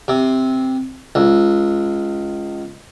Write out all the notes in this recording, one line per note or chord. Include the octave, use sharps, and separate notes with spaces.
C3
C#2